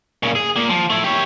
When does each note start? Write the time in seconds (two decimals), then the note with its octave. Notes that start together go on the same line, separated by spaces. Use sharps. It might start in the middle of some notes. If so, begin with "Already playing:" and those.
0.23 A#2 C#3
0.35 G#4
0.56 A#2 A#3
0.70 F3
0.90 A3 E4
1.04 G4 C#5